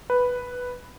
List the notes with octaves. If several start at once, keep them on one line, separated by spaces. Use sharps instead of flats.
B4